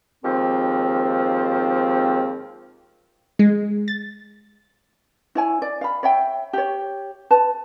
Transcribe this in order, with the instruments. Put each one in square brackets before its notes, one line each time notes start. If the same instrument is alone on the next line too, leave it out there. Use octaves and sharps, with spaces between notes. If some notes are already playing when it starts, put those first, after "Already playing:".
[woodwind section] D#2 G#2 F3 C4
[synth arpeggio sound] G#3
A6
[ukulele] E4 C#5 G#5
D5
F5 B5
C#5 E5 G5
G4 C#5
B4 A5